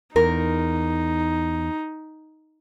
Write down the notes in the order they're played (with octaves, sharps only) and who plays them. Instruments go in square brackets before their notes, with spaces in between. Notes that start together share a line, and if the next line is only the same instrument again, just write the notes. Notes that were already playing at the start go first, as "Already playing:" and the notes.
[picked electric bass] E2 [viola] D#4 [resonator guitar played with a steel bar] A#4